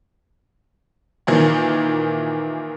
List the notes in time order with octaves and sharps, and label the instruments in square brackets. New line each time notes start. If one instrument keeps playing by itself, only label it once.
[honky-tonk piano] A#2 D#3 E3